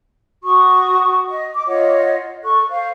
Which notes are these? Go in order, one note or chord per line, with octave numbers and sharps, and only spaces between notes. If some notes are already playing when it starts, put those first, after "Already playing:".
F#4 C#6 D#6
D#5
D6
F4 C#5 D#5 F#5
A4 C#6 F#6
C5 F5